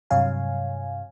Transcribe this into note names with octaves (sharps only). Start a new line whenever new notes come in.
G2 C3 F#3 C#5 F5 G#5